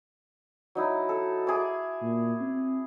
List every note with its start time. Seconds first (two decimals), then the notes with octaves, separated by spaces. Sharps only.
0.75 F#3 D#4 E4
1.09 A4
1.47 G#4 E5 D6
2.02 A#2
2.41 C4